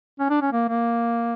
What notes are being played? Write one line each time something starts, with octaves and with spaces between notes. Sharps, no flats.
C#4
D4
C#4
A#3
A#3